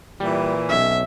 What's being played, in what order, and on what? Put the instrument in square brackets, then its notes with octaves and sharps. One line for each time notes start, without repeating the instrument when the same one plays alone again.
[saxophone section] A#2 E3 [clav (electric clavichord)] G3
[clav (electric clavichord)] B1 C#4 [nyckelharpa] E5